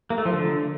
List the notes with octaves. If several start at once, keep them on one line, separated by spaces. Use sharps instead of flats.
A#3
A3
F3
D3